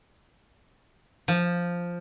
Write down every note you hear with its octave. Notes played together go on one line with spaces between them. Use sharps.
F3